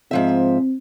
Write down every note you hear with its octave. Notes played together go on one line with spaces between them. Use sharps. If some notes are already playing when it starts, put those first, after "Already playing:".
G#2 F3 C4 E5